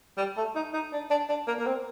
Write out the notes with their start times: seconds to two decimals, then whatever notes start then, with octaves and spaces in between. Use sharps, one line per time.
0.18 G3
0.37 A3
0.55 D#4
0.74 D#4
0.93 D4
1.11 D4
1.29 D4
1.47 A#3
1.59 A#3
1.67 C4